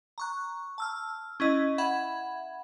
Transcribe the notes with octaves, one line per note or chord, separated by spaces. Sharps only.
A#5 C#6 F#6
A5 E6 F6
C#4 E4 D#5
E5 F#5 B5 G#6